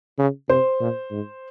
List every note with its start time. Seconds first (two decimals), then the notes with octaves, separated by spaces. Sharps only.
0.18 C#3
0.49 C3 C5
0.80 A#2
1.11 G#2